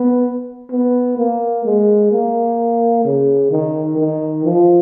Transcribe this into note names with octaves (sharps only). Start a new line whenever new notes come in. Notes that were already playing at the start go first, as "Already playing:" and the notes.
Already playing: B3
B3
A#3
G#3
A#3
C#3
D#3
D#3
F3